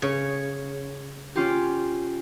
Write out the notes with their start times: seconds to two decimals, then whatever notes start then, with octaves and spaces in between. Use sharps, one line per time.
0.02 C#3 C#5
1.35 C#4 F4 G4